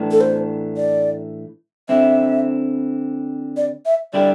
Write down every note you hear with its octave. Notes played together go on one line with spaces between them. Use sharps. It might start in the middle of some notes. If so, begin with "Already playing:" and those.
Already playing: A2 E3 A3 D4
A4
C5
D5
D3 C4 E4 E5
D5
E5
D3 G3 E4 G4 D5